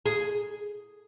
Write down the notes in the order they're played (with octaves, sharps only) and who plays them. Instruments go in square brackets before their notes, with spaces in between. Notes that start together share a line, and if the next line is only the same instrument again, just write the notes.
[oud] G#4